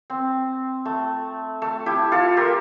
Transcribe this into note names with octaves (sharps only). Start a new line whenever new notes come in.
C4
A3
A3
E4 G4
F4 A4
G4 A#4